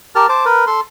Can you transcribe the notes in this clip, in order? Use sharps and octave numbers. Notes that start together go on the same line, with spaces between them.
G4 A#4 A5 F6
C5 A5 D6
A#4 B4
A4 C6